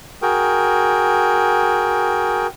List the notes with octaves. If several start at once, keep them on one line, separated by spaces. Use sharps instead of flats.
F#4 G#4 A#4 G5